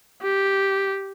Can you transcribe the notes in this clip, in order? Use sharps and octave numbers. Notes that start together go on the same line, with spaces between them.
G4